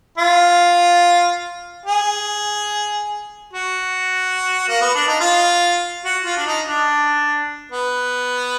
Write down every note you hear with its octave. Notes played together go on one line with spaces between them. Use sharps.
F4
G#4
F#4
A#3
B3
D4
D#4
F4
F#4
F4
D4
D#4
D4
B3